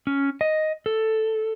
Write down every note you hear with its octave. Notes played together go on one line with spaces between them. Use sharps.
C#4
D#5
A4